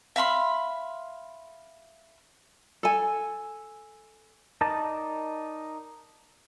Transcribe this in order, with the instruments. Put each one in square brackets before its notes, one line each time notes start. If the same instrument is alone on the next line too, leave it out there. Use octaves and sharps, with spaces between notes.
[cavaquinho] E5 F5 B5 C6
[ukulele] A4 G#5
[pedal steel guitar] D#4 A#4 D5 D#5 A5